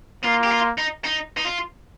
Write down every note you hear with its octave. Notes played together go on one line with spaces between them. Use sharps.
A#3 F4
G4
F4
D#4
D#4
D#4
F4